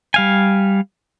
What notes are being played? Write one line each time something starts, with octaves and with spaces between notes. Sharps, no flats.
G3 F5 G#5